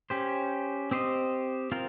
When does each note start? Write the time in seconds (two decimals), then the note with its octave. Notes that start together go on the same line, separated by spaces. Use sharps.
0.10 C#4 G4 C5
0.91 C4 G4 C5 D#5
1.72 C4 F4 A#4